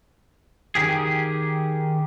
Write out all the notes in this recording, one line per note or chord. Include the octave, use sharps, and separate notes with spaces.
D#3 G4 G#4